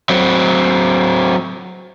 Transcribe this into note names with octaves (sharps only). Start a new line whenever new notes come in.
F#3 C4